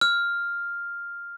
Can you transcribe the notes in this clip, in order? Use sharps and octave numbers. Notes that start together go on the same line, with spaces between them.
F6